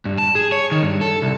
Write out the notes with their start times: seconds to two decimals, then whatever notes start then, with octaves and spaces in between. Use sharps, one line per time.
0.05 G2
0.18 A5
0.35 G#4
0.52 C#5
0.72 D#3
0.83 G2
1.01 A4
1.22 C2